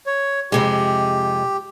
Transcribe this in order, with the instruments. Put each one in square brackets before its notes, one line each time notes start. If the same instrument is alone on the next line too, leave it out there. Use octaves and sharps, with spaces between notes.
[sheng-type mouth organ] C#5
[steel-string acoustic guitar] F2 C3 G#3 [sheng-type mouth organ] G4